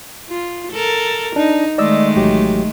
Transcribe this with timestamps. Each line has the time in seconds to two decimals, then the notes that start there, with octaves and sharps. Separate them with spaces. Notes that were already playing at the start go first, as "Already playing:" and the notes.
0.30 F4
0.72 A4 A#4
1.36 D4 D#4
1.78 D#3 G#3 A3 D5 D#5 E6
2.16 A1 F#3 G4